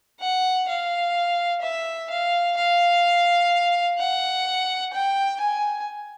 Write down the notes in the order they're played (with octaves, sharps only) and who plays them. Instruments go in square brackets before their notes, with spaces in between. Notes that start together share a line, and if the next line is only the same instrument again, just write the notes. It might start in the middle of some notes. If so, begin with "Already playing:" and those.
[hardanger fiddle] F#5
F5
E5
F5
F5
F#5
G5
G#5